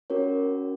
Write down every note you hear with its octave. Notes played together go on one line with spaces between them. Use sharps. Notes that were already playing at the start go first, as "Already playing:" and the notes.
C#4 F#4 A#4 C#5